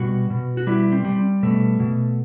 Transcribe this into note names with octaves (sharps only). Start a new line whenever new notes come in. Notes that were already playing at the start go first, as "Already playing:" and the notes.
Already playing: B2 G3 F#4
B2
F#4
G3 E4
C4
G3
B2 A3
B2